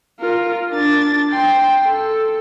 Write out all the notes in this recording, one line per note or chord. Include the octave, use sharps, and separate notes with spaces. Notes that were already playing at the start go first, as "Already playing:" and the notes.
F4 A#4
D4 A6
G5 C6
A4